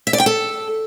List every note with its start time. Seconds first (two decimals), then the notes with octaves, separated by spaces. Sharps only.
0.07 E5
0.13 D5
0.20 G5
0.26 A4